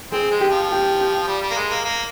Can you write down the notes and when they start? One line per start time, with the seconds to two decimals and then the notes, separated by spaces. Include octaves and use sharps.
0.12 C4 G#4
0.31 G#3
0.41 G4
0.50 F3
0.70 G4
1.27 G3
1.42 G3
1.51 A#3
1.56 G#3
1.71 A#3
1.85 A#3